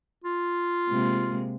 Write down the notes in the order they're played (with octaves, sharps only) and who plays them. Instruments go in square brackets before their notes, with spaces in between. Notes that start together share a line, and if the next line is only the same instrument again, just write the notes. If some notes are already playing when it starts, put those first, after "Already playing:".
[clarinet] F4
[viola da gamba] C3 G#3 A#3